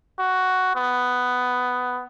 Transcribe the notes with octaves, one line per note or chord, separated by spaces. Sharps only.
F#4
B3